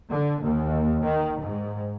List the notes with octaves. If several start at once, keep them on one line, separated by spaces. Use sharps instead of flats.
D3
D#2
D#3
G#2